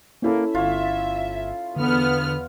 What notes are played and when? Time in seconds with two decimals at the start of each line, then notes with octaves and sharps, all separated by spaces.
0.22 A#3 C#4 E4 A4
0.55 G1 F4 C#5 E5
1.76 E2 D3 B3 F6